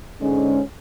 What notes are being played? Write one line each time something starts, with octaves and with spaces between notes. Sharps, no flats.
G#2 D3 G#3 C#4